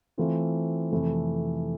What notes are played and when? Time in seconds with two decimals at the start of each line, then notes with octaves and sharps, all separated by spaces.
0.18 E3 A3 C4 F4
0.91 F2 C3 E3 A3